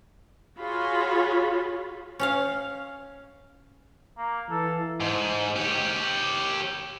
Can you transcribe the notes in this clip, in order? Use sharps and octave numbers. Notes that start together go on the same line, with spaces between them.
F4 F#4 G#4 C#5 B5
C#4 C#5 F5
A#3
E3 A4
G#2
G4 C#5